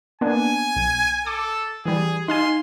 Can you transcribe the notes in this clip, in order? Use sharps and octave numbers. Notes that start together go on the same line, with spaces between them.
A#3 B3 D4 G#5
B1
A4 D6
E3 G3 G#4
D#4 F5 G#5 C6